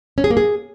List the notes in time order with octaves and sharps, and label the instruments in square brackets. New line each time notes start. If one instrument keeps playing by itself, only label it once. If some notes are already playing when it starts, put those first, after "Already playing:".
[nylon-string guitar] C#4
G#4
A#3
G#4